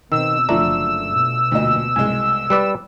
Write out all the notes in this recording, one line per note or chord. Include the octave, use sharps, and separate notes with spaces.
B2 D#3 C4 E6
F#1 D3 F3 A3 D4 A#5
B2
D2 A#2 D#5
C2 G#3 G#5
G3 B4 D5